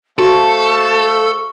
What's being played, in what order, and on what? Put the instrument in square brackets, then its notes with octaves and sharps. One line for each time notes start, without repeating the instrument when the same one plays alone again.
[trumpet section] A3 C5 F5 [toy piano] F#4 [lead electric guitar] A4 [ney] C#6